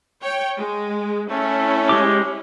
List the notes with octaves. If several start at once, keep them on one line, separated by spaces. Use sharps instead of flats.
C#5 G5
G#3
A3 C#4 E4
G#3 G4 D6